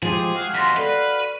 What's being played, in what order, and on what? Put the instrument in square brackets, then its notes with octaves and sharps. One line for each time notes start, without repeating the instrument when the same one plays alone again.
[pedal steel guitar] F3 G#3 G4 [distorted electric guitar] G#4
[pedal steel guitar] F#4 F5
[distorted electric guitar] D#2 G#2 [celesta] C6 A#6 B6
[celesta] A4 D5 [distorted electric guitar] B4
[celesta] D#7